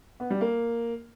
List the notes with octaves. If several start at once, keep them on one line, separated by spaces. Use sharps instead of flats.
B3
G3
A#3